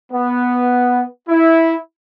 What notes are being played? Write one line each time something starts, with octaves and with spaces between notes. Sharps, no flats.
B3
E4